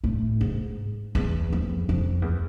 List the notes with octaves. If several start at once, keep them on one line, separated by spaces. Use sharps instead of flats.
A2
G#2
E2
F2
F2
E2